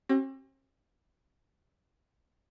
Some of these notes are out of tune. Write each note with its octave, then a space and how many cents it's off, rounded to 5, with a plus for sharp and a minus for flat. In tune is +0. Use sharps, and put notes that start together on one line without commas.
C4 +45 G4 -40